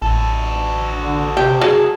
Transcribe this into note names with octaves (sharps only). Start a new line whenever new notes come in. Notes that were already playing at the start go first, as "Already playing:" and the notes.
A1 F#4 A4
D3
C3 G4
F#3 G#4